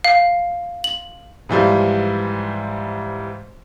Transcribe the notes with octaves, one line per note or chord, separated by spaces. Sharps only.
F5
F#7
G#2 E3 F3 G3